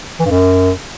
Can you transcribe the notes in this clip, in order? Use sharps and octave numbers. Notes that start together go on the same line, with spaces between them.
E3
G2
F#2